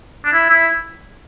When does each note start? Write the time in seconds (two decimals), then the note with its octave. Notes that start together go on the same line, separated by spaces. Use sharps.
0.25 D4
0.33 E4
0.50 E4